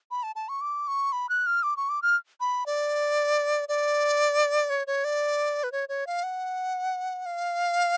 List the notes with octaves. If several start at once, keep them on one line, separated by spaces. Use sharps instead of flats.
B5
A5
A5
C#6
D6
C#6
B5
F#6
F6
D6
C#6
D6
F6
B5
D5
D5
C#5
C#5
D5
B4
C#5
C#5
F5
F#5
F5